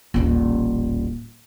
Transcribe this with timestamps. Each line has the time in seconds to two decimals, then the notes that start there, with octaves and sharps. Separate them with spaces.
0.14 D#1 A1